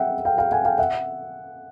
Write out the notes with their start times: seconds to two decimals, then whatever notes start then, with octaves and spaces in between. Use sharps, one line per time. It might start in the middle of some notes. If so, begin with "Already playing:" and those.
Already playing: E5 F#5 G5
0.25 F5 G5
0.38 F5 G5
0.52 F#5 G#5
0.65 F5 G5
0.78 E5 F#5